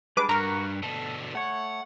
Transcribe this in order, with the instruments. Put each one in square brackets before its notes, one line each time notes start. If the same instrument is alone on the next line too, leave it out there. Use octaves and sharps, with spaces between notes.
[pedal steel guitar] G3 G#3 D4 [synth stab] B4 D6
[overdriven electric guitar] G2 [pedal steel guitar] F#4 [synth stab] A#4 A#5
[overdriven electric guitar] B2 D3 [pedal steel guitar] A4
[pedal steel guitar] A3 C#5 [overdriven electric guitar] F#5